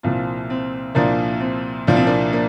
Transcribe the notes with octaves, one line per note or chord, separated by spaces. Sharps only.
C2 A#2 F3 C4 F4
C4
C2 A#2 F3 A#3 D4
C4
C2 A#2 F3 D4
C4
A#3 D4
A#3 D4